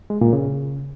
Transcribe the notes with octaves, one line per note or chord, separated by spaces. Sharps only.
G#3
A#2
C#3